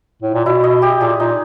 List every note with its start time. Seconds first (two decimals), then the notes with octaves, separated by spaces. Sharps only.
0.23 A2
0.34 A#2
0.46 B2 E4
0.64 D#5
0.82 G4
1.01 A#2 G#4
1.20 A#2 D#4